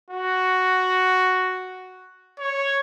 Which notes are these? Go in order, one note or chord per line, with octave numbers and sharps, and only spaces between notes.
F#4
C#5